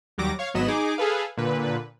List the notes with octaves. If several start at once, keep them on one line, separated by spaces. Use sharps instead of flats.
D#2 F#3 G3 D6 A#6
C#5 F5 C#6
G#1 F#3 B3 D#5 B5 E7
D#4 G#4 D6
G#4 A4 B4 F5
A#2 D3 B4